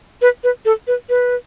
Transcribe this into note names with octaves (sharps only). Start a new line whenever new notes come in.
B4
B4
A4
B4
B4